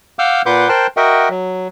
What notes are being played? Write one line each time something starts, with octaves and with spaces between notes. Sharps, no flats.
F5 F#5 D6 E6 F6 G6
A#2 B4 F#5 C6 D6 G6
A#4 C5 G5 A5 C6 F#6
F#4 A#4 D#5 E5 F#5 G5
F#3